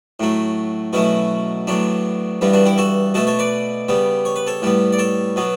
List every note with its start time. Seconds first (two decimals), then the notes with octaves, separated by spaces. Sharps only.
0.20 A2 F#3 A3
0.93 B2 F#3 A3 C#4 E4
1.67 A2 F#3 B3 D4
2.41 G2 E3 G3 B3
2.53 D4 F#4
2.65 E4 G4
2.78 F#4 A4
3.14 B2 A3 F#4 A4
3.27 A4 C#5
3.39 B4 D5
3.88 C#3 G3 B3
4.25 C#5
4.36 B4
4.47 A4 C#5
4.62 A2 G3 B3
4.93 D5
4.99 A4 C#5
5.36 B2 F#3 B3